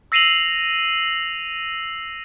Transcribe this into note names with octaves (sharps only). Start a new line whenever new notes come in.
E6 A#6 C7 D#7 F7 F#7